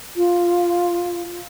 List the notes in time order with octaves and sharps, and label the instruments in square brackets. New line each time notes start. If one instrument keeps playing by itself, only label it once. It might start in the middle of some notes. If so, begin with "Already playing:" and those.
[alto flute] F4